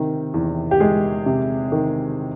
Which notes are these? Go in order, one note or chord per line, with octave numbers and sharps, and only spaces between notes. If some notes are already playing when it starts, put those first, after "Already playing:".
Already playing: C3 D#3
E2
G4
G#3 G#4
C3
D#3